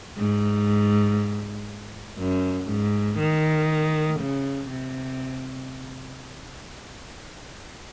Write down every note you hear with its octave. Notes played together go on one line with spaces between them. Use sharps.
G#2
F#2
G#2
D#3
C#3
C3